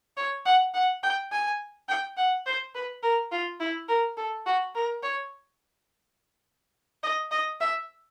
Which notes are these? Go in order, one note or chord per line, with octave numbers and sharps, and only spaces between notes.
C#5
F#5
F#5
G5
G#5
G5
F#5
C5
B4
A#4
F4
E4
A#4
A4
F#4
A#4
C#5
D#5
D#5
E5